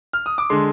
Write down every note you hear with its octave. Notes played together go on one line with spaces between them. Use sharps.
F6
D#6
D6
D3 G#3 C6